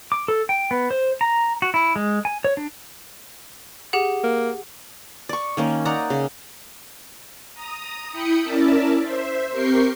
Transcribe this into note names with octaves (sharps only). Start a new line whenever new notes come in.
D6
A4
G5
B3
C5
A#5
F#4
E4
G#3
G#5
C#5
D4
G4 G#4 F#5
A#3
D5 C#6
D#3 A#3 C#4
D#4 D5 F#5 A#5
C#3
A#5 D#6
E4 G5 B5 D#6 C#7
C#4 E4 A#4 D5 E5 A5
C5 E5
C4 G4 A#4 G5 C#6 C7